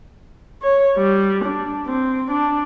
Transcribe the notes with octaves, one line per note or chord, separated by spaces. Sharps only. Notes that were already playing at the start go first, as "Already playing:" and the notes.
C#5
G3
D4
C4
D4